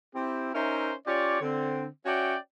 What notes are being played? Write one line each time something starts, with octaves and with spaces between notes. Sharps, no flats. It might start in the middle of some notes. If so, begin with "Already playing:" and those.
C4 E4 G4
C#4 D#4 A#4 C5 E5
C#4 F4 G4 C#5 D5
D3 C4
C#4 F#4 C#5 D5 E5 G5